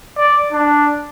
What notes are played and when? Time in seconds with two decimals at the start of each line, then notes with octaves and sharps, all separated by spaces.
0.17 D5
0.52 D4